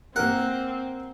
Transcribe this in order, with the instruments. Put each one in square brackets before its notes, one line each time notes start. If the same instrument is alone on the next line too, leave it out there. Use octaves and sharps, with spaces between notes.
[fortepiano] A#3 A#4 [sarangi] C4 [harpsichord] F#5